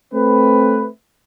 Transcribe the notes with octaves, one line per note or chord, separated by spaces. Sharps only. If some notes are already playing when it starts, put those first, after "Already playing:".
A3 C4 B4